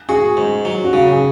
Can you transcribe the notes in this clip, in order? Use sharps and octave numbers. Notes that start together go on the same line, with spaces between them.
F#4 G#4
G#2
F#3
F#4
C#3 G#4
G#4